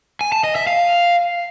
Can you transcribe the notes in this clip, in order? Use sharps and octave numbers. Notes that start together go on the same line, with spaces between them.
G#5
A5
D#5
E5
F5